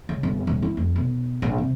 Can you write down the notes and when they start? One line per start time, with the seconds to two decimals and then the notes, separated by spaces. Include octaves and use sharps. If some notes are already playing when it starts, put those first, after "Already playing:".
0.09 C#2
0.23 G1
0.47 D#1
0.62 E4
0.77 F2
0.96 B1
1.42 A#1
1.58 C3